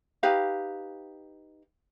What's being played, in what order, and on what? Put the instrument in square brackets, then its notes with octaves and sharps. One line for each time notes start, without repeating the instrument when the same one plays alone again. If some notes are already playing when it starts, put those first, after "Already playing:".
[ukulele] D#4 G4 B4 F5